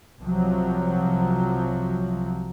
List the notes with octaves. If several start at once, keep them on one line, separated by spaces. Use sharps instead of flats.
C2 C3 F3 F#3